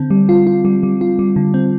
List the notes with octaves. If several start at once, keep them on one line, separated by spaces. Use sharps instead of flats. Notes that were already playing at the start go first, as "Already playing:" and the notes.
Already playing: D3 C4
G3
F4
F4
G3
G3
F4
G3
D3
C4